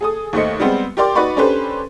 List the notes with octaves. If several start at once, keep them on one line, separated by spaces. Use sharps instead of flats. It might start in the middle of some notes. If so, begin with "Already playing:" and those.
G#4 A4 D#6
D#2 A3 C5 D#5 C#7
G3 G#3 B3 C4
G4 A#4 D5 G5 C6 D6
D#4 F#4 B4 D5 B5 C#6
C#4 D4 G4 A4 B4 C5